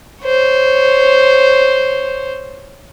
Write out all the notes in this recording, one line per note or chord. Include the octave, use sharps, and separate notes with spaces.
C5 C#5